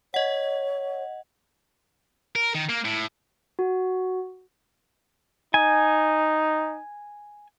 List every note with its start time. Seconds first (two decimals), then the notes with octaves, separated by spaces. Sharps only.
0.14 C#5 D#5 F#5
2.36 A#4
2.55 D#3
2.69 A#3
2.85 A2
3.59 F#4
5.54 D#4 G#5